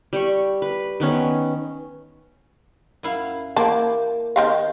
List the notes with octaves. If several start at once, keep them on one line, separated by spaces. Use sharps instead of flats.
G3 G4 C#6
B4
D#3 B3 C#4
F#2 E4 F5
A#3 E4 G4 A5
D#3 C4 F5